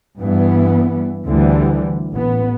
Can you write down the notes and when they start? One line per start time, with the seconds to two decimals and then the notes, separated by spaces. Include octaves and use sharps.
0.19 G2 E3 B3
1.26 D2 D3 E3 G3
2.12 A1 B3